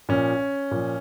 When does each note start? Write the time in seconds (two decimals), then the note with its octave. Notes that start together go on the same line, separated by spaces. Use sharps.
0.09 A#2 F3 C#4
0.71 A#2 F3